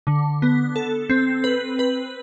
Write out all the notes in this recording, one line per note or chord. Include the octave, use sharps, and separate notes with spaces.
D3
B3
A4
C4
B4
B4